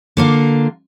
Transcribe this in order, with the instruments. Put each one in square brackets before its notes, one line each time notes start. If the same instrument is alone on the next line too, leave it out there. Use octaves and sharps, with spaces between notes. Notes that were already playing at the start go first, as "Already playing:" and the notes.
[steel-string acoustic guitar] D3 A#3 F4